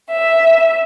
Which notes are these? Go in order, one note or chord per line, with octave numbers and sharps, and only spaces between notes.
E5